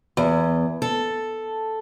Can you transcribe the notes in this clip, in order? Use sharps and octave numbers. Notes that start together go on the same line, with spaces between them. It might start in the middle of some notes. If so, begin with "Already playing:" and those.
E2
A4